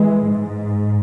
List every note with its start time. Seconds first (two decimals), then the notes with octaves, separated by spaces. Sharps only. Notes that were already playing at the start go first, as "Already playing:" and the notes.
Already playing: E3 G#3
0.26 G#2